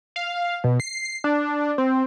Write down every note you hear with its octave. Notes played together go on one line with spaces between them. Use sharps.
F5
B2
C7
D4
C4